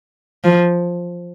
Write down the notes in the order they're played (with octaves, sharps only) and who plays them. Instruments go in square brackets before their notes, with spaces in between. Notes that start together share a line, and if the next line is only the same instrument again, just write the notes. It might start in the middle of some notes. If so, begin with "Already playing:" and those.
[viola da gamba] F3